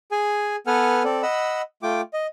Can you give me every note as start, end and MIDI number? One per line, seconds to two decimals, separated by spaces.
0.12 0.56 68
0.12 0.56 80
0.67 1.03 59
0.67 1.03 69
0.67 1.03 71
0.67 1.03 78
0.67 1.03 80
0.67 1.03 89
1.04 1.22 60
1.04 1.22 69
1.04 1.22 74
1.23 1.62 75
1.23 1.62 78
1.23 1.62 83
1.23 1.62 88
1.83 2.01 57
1.83 2.01 65
1.83 2.01 79
1.83 2.01 86
2.14 2.27 75